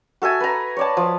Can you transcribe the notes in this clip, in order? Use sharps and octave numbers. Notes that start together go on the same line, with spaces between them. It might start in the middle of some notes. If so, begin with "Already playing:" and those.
F#4 A4 E5 G#5
B4 A#5
C#5 D5 A5
F3